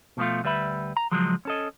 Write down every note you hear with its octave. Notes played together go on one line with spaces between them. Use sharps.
B2 F3 G#3 A3 F4
D2 G3 B4 E5 B5
A#5
C#2 F3 F#3 G#3
C#4 A4 D#5